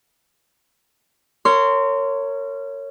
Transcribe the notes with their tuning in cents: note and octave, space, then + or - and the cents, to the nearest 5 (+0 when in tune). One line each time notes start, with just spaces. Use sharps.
A#4 -30 C#5 +0 C6 -15